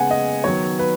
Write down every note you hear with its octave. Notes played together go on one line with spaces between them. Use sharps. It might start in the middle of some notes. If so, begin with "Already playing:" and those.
Already playing: C#3 G#3 B3 F#5 G#5
D#5
D#3 F#3 B3 C#5
B4